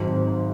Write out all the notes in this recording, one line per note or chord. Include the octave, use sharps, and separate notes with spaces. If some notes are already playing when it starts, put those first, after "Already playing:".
Already playing: G#1 G#2 F#3 C4 D#4